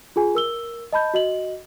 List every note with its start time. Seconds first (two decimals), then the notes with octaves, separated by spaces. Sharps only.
0.16 F4 G#4 G#5
0.35 A#4 E6 G7
0.92 D#5 A5 B5 G6
1.14 F#4 D#5 F#7